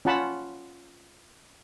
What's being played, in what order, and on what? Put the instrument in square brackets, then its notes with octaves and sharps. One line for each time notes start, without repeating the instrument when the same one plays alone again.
[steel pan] C#4 F4 F#5 A5 B5